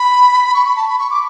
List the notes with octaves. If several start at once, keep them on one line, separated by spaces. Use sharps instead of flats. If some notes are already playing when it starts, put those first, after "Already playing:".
Already playing: B5
C#6
B5
A5
B5
C#6
D6